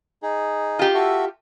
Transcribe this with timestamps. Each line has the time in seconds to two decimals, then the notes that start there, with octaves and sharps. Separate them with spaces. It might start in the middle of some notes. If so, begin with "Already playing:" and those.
0.22 D#4 G#4
0.79 F4 G4
0.94 F#4 A4 E5